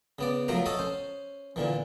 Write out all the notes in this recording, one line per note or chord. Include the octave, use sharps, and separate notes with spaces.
C#3 B3 D5
F3 F#3 A3 A#3 F#5 A#5
A4 C#5 D#5 F#5 A5
C#4 C5
A#2 D3 E3